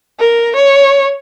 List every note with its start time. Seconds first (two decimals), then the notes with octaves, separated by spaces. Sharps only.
0.20 A#4
0.56 C#5